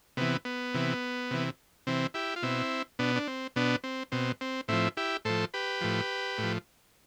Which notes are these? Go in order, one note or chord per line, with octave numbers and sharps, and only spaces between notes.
C3 E3 B3
B3
C3 E3
C3 E3
C3 E3 C4
E4 G4
F4
B2 C4 E4
B2 B3 D4
D4
C4
B2 B3 D4
C4
B2 C4
C4
A2 F3 C4 E4
E4 G4
A2 F3 A4 C5
G4 B4
A2 F3
A2
F3